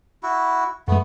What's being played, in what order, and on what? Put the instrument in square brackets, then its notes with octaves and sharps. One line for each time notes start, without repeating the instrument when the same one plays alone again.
[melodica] E4 F#4
[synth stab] F#2 G#3 [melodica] A3 B3